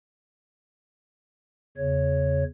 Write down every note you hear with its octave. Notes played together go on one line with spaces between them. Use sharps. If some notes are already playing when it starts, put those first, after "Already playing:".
E2 C#3 C#5